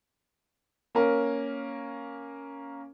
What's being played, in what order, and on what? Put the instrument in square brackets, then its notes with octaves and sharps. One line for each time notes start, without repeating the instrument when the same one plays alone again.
[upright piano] A#3 C#4 A#4